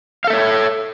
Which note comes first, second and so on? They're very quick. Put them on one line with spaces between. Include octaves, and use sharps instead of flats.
F5 A4 E5 C#5